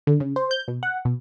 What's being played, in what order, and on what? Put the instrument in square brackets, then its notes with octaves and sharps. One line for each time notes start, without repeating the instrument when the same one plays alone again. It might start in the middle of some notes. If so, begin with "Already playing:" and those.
[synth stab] D3
C#3
C5
G6
B2
F#5
B2